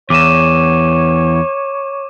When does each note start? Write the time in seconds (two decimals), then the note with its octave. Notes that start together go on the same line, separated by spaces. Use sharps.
0.10 E2 C#5 D6 D#7 E7